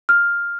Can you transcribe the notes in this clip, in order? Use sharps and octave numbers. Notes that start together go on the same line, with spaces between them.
F6